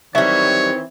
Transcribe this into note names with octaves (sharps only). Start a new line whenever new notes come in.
D#3 E3 F#3 G3 C4 C#5 E5